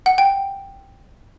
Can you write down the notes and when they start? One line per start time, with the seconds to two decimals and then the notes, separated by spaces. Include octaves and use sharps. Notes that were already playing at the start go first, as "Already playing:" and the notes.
0.06 F#5
0.18 G5